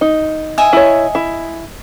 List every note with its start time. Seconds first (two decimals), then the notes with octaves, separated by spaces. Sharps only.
0.01 D#4
0.58 D#5 E5 G#5
0.73 E4 C#5
1.15 E4